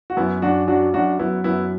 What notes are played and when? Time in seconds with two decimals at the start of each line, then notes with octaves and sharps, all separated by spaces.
0.10 F#4
0.17 F#2 B3 E4
0.42 F#2 D4 F#4
0.68 F#3 D4 F#4
0.94 F#2 D4 F#4
1.19 F#3 B3 E4
1.44 F#2 B3 E4